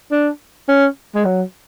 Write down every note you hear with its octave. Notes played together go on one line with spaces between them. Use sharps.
D4
C#4
G#3
F#3